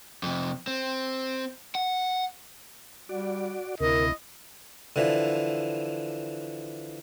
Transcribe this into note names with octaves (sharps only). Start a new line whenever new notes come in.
F2 C3
C4
F#5
G3 F#4 D5
D2 C3 E4 A#4 D#5
D3 E3 F3